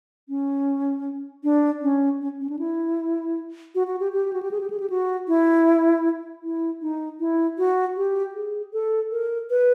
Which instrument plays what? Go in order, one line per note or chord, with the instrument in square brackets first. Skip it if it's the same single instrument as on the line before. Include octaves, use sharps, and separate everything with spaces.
[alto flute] C#4
D4
C#4
C#4
C#4
D4
E4
F#4
F#4
G4
G4
F#4
G4
G#4
G4
G#4
G4
F#4
E4
E4
D#4
E4
F#4
G4
G#4
A4
A#4
B4